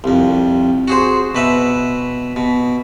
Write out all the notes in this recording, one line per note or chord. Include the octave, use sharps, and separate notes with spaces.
C2 F2
F#4 G#4 C5
B2 B4 E5
B2